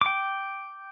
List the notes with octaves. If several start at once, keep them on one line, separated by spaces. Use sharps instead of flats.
G5 D6